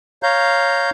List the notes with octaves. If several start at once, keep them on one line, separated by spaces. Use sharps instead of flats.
C#5 F5 A#5 G6